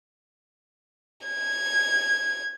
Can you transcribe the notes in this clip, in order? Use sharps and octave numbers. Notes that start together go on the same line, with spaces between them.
G#6